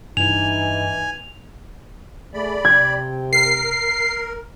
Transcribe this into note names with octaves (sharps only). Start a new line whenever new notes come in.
G2 E3 D#4 G#5 F7
A3 G#4 D5 B5
C3 G5 G#6
A#4 C7